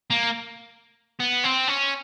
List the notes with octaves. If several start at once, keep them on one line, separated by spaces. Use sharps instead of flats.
A#3
B3
C4
C#4